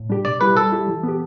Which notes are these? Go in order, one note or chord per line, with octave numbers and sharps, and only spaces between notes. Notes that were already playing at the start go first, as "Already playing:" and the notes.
Already playing: A2
G3 D4 G4
B2 D5
G3 E4 G4 B4
G3 A4
E4 G4
E3
B3
G4